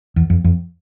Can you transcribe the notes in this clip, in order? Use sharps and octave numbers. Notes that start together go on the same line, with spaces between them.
E2
F2
F2